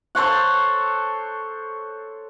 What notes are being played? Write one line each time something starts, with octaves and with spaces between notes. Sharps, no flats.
A4 C5 C#5 F#5